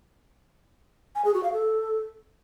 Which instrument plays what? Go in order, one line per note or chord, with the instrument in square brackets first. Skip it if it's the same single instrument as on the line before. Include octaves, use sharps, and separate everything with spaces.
[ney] G#5
G#4
F#4
F5
A4